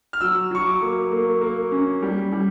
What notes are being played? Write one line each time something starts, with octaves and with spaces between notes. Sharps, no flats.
F6
F#3 E6
F#3 C#6
D6
A#3
A#3
A#3
C#4
G3
G3